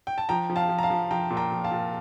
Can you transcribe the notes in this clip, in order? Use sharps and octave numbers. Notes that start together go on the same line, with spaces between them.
G5
A5
F3 G5 A#5
F3
F5 A5
F3
A#5
F5 A5
F3
F3 G5 A#5
A#2
G5 A#5
F3
F5 A5
A#2